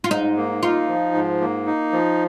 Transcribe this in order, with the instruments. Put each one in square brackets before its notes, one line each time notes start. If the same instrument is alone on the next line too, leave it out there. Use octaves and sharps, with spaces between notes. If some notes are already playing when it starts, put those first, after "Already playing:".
[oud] F4
[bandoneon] G#2 [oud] D#4
[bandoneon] A#3
[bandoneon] D#4 [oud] F4
[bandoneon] F3
G#2
A#3
D#4
F3